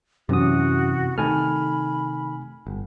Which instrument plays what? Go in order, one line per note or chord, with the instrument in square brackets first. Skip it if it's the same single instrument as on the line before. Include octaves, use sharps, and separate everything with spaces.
[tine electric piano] F#2 D#6 [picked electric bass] C3 E3 [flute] F#4
[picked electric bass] C3 D#3 A3 [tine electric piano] G#5 F6 [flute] B5
[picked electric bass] G1